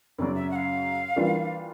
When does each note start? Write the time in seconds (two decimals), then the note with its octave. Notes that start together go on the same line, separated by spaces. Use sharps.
0.18 F#2 C#3 F#3 D5
0.35 E5
0.51 F#5
0.56 F5
1.16 E3 G3 A#3 D4 F4